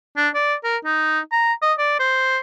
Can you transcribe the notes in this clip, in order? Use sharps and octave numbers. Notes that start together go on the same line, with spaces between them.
D4
D5
A#4
D#4
A#5
D#5
D5
C5